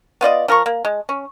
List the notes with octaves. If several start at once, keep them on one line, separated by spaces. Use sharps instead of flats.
B3 F4 D5 D#5
F3 A#4 C6 C#6
A#3
G#3
C#4